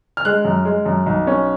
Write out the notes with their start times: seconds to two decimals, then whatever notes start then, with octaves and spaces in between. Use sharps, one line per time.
0.17 F6
0.25 G#3 F#6
0.45 F#2
0.65 G#3
0.86 F#2
1.06 B1
1.27 C#4